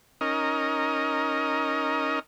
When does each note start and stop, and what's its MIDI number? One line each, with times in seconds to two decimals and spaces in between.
0.21 2.19 61
0.21 2.19 63
0.21 2.19 70
0.21 2.19 75